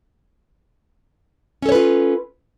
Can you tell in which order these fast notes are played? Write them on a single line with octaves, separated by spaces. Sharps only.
C#4 A4 C#5 B4 F4